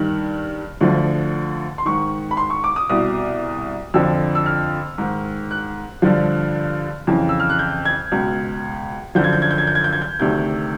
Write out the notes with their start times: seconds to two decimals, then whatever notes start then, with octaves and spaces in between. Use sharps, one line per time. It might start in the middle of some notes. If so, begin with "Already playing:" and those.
Already playing: G2 D#3
0.81 D2 D3 F3
1.78 C6
1.85 G#2 D#3 C#6
2.31 B5
2.37 C6
2.50 C#6
2.64 D6
2.76 D#6
2.89 C2 B2 D#6
3.94 F2 D3 F3 E6
4.35 E6
4.46 F6
4.98 G#2 D#3
5.51 F#6
6.02 G2 D3 F3
7.07 F2 C#3 E3
7.29 E6
7.40 F6
7.50 F#6
7.59 G6
7.85 G#6
8.12 C#2 B2
9.15 F#2 D3 F3 G6
9.24 G#6
9.33 G6
9.42 G#6
9.51 G6
9.58 G#6
9.67 G6
9.75 G#6
9.84 G6
9.93 G#6
10.02 G6
10.19 D2 C3 D#3 G6